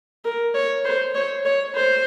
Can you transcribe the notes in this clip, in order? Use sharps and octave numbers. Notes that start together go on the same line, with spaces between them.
A#4
C#5
C5
C#5
C#5
C5